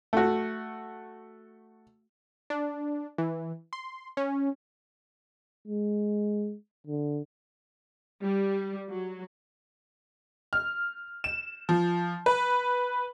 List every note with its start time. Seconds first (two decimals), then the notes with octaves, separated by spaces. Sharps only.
0.13 A3 F#4
2.50 D4
3.18 E3
3.73 C6
4.17 C#4
5.68 G#3
6.87 D3
8.21 G3
8.89 F#3
10.53 F6
11.24 E7
11.69 F3
12.26 B4